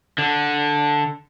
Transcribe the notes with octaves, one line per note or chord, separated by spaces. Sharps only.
D3